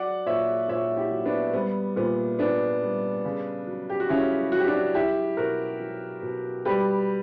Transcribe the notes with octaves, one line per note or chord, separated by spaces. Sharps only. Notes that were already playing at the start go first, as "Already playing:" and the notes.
Already playing: F#3 D5 F#5
A#2 C#5 E5
A#2 C#5 E5
E4 G4
F#3
B3 D4
G3 B3
A#2 B3
A#2 B3 D4
G3
C#3
F#3
G4
F#4
C#3 C#4 E4
F#3 F#4
G4
D4 F#4
F#3 E4 G4
B2 F#4 A#4
F#3
B2
G3 G4 B4